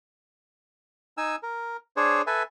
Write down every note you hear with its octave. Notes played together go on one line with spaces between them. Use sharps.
D#4 G#5 E6
A#4
D4 G#4 C5 C#5
A4 B4 E5 G#5